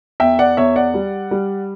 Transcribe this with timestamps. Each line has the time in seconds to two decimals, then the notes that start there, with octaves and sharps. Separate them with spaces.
0.20 E2 E5 G5
0.39 D5 F#5
0.57 E2 C#5 E5
0.76 D5 F#5
0.94 G3
1.31 G3